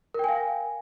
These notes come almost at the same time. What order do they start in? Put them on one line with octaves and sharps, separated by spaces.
A#4 G5 G#5 F5